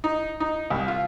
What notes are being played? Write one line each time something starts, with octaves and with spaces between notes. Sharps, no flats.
D#4
D#4
C2
F4